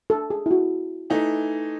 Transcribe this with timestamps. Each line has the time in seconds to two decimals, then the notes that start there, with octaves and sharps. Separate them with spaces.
0.10 A4
0.30 G#4
0.46 E4
0.51 F#4
1.10 E3 A3 D#4